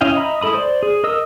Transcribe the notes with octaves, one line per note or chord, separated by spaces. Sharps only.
C#4 E4 D#5 F5 G5
D#5 E5 A#5 B5 D#6
G#3 E4 A4 B5 D#6
C5 D5
G#4
A#4 D#5 D#6 E6